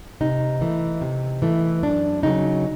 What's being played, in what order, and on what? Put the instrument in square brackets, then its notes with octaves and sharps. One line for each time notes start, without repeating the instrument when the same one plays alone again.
[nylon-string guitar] C3 D#4
E3 A3
C3
E3 A3
F#2 D4
C#3 F#3 D#4